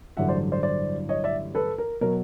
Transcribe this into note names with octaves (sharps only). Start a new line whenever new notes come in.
A1 G2 D3 F#3 E5 F#5
C5 D5
C5 D5
C5 D5
C#5 D#5
D5 E5
A4 B4
A#4
B2 F#3 A#4